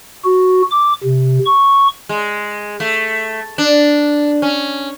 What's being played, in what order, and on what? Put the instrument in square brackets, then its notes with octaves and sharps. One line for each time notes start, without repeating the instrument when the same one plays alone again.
[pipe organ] F#4
D6
C3
C#6
[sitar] G#3
A3
D4
C#4